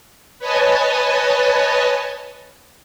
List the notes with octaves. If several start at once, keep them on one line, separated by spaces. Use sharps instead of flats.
B4 C#5 D#5 G#5 A5